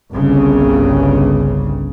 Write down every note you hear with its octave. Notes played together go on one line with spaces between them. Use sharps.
G1 C2 G2 C#3